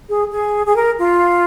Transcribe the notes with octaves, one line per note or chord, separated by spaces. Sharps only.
G#4
G#4
G#4
A#4
F4